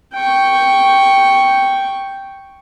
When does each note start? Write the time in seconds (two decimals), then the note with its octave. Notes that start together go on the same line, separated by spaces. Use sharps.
0.14 G5 C#6